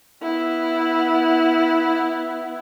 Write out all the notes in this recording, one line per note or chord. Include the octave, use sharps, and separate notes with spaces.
B3 E4